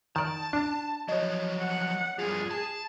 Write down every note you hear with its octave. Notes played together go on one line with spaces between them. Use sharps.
D#3 D5 A5
D4
F3 F#3 C#5 D#5
F#5
G2 F3 G#4
A5